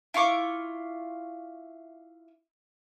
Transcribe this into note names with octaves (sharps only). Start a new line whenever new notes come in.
E4 F4 C#6 D6